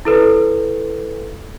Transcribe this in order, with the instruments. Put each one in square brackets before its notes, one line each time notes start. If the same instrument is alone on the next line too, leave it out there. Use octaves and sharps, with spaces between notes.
[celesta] E4 A4 B4